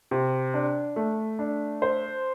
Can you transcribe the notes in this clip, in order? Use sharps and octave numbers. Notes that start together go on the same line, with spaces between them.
C3
D4
A3
D4
C5